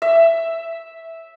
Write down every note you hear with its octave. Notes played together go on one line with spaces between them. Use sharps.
E5